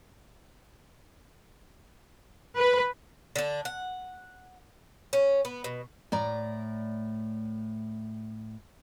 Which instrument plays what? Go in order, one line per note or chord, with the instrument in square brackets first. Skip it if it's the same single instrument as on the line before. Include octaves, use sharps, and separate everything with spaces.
[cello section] B4
[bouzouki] D3 D4
F#5
C#4
B3
B2
[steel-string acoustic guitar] A2 D5 A#5